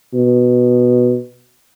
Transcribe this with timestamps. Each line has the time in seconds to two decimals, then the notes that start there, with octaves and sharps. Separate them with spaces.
0.14 B2